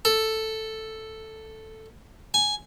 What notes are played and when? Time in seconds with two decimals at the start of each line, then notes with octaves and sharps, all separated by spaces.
0.05 A4
2.34 G#5